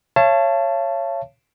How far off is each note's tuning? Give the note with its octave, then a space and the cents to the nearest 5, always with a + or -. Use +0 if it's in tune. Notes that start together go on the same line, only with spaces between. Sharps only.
C#5 -10 F5 -45 A5 +0